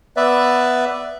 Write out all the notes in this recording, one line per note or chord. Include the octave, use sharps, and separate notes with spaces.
B3 B4 D5 E5